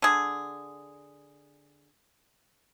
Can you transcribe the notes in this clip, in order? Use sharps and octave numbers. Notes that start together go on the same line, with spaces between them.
D3 G#4